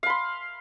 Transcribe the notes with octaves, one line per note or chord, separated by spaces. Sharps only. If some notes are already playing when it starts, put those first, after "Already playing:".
F5 B5 C6